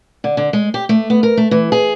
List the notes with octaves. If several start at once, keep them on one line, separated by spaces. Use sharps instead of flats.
D3
D3
G#3
G4
A3
B3
A#4
A3
E3
G#4